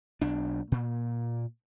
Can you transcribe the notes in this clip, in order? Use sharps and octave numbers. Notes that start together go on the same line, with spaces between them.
B1 D4
A#2